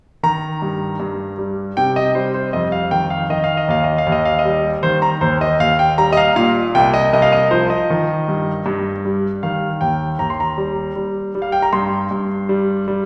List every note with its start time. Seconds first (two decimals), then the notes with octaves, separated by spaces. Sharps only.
0.23 D#3 A#5
0.62 G2
1.00 G2
1.38 G3
1.77 C3 G5
1.96 D#5
2.15 G3 C5
2.34 C5
2.53 F2 D#5
2.72 F5
2.91 D#3 G5
3.10 F5
3.29 D#3 D#5
3.44 F5
3.57 D#5
3.68 D#2 F5
3.84 D#5
3.98 F5
4.06 D#2
4.12 D#5
4.25 F5
4.39 D#5
4.45 G3
4.83 D#3 C5
5.02 A#5
5.21 D#2 C5
5.41 D#5
5.60 D#2 F5
5.79 G5
5.98 G3 A#5
6.13 D#5
6.17 F5
6.36 A#2 F5
6.75 C2 G5
6.94 D#5
7.13 C2 D#5
7.22 F5
7.32 D#5
7.51 F3 C5
7.70 D#5
7.90 D#3
8.28 G2
8.66 G2
9.05 G3
9.43 D#3 F5
9.81 D#2 G5
10.19 D#2 A#5
10.30 C6
10.40 A#5
10.58 G3
10.96 G3
11.35 G3
11.42 F5
11.52 G5
11.62 A#5
11.73 G2 C6
12.11 G2
12.49 G3
12.88 G3